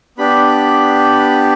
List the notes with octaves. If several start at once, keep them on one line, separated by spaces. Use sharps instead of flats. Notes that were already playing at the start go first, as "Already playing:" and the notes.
B3 D4 G4 B5